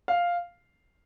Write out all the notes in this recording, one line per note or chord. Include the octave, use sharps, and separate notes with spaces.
F5